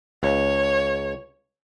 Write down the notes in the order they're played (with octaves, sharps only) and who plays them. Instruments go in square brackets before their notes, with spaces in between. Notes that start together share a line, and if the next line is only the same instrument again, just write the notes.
[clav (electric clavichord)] C#2 [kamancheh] C#5